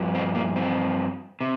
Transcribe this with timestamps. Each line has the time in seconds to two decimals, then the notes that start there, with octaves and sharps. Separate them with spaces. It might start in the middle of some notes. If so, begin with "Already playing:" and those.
Already playing: G2 F3
0.15 C4
0.35 A#3
0.56 C4
1.41 C3